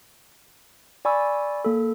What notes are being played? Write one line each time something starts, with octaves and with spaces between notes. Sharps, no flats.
D5 G#5 B5 C#6 E6
A#3 A4